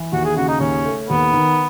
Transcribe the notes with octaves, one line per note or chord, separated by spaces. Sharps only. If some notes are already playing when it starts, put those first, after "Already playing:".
Already playing: E3
D#2 F#4
G#4
C#3 F#4
D#4
D#2 C#4
A3
D#2 B3
D#3